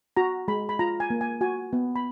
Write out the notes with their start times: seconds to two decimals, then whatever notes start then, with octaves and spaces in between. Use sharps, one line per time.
0.17 F#4 A#5
0.48 G#3 B5
0.69 B5
0.79 F4 A#5
1.00 G#5
1.10 A#3
1.21 G#5
1.41 F#4 G#5
1.73 B3
1.96 B5